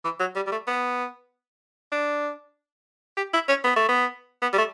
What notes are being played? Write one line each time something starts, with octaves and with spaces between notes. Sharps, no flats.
E3
F#3
G3
G3
A3
B3
D4
G4
E4
C#4
B3
A3
B3
B3
G3
A3